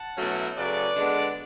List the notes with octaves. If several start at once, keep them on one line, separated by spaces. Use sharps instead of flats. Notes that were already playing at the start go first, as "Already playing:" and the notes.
Already playing: F#5 A5
B2 F#3 A3 C#4 E4
C#3 F#3 A3 B4 D5
D3 G#3 B3 D4